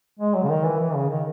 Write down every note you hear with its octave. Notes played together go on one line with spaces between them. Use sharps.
G#3
F#3
C#3
D#3
E3
E3
C#3
D#3